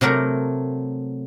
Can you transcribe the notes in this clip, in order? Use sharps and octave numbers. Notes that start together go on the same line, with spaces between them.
C3 F#3 A3 A#4